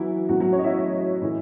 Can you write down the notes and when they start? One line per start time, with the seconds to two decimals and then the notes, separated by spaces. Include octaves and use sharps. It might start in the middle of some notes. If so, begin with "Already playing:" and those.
Already playing: E3 F#3 E4 F#4
0.29 A2 E3 F#3 F#4
0.40 F#3 F#4
0.52 C#4 C#5
0.59 D#5
0.64 E4 E5
1.22 A2 E3